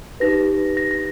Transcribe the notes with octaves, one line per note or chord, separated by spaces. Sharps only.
D#4 G4 B4 A#6
A#6
A#6